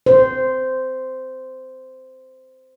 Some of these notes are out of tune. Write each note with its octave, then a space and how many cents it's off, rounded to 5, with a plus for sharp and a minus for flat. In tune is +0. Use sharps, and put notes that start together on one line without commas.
C5 -10